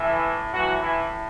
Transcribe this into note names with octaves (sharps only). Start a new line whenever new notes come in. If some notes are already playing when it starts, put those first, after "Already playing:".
Already playing: A2 E3 E4
A2 E3 F#3 F#4
E3 E4